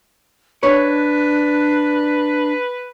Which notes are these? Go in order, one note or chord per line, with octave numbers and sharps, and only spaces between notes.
D4 B4 C#5